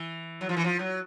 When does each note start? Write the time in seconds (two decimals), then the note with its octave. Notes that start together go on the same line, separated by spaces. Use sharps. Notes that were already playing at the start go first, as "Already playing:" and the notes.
Already playing: E3
0.41 F#3
0.49 F3
0.57 E3
0.64 F3
0.79 F#3